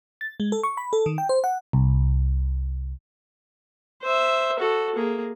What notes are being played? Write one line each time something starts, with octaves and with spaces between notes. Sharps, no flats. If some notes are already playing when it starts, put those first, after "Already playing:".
A6
G#3
A4
C#6
B5
A4
D#3
G5
C5
F#5
C2
C5 E5
F#4 A4
A#3 G#4